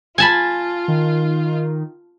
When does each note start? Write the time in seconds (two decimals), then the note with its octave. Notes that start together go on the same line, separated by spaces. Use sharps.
0.18 F4 G#5 A5 B5
0.88 D#3